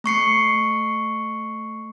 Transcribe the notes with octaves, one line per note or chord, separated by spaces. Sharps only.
A3 C#6 C7 C#7